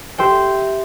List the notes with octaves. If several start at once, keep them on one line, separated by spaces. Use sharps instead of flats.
G4 C5 E5 G5